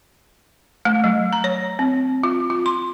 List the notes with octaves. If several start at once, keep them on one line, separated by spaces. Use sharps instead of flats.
A3
F#3
A#5
C#5
C4
F4
F4
C6